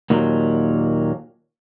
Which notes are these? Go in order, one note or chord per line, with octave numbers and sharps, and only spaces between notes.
D#2 A#2 F#3